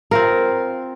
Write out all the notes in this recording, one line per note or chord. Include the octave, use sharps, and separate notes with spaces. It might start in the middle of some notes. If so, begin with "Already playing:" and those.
C4 F4 A#4